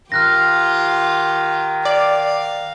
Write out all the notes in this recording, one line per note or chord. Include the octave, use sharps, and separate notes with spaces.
D#3 F4 G4 F6 F#6 A#6
D5 F5